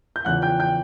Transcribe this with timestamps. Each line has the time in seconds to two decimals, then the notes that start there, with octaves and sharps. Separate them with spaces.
0.16 G6
0.25 E2 C#3 F3 F#5 F#6
0.42 G5 G6
0.60 G5 G6